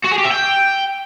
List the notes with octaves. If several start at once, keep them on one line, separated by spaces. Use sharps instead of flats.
F#4
G#4
G4
E5
G5